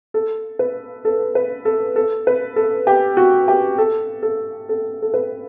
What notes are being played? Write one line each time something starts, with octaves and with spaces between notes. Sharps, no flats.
A4
B4
A4
B4
A4
A4
B4
A4
G4
F#4
G4
A4
A4
A4
A4
B4